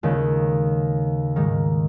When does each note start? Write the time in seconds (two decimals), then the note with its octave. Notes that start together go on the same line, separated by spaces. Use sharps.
0.03 D#2 C#3 G#3
1.36 G#2 D#3 G#3 D#4